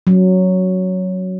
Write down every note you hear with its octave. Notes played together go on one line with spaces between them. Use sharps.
F#3